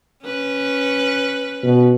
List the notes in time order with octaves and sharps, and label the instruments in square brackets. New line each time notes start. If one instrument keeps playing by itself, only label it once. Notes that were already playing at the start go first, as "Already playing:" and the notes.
[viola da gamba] C#4 B4
[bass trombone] B2